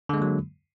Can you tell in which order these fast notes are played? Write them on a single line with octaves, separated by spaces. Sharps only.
D3 G#3 A#3 F#3